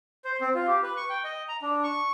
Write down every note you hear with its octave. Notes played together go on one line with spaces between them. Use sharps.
C5
C4
F4
G4
B4
C#6
G5
D#5
A#5
D4
C#6